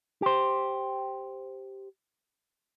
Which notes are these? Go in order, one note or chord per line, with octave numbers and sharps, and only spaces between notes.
G4 C5